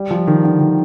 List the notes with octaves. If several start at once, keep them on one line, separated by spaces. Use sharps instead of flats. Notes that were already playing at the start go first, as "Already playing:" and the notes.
Already playing: G3
F3
D#3
D3
D#3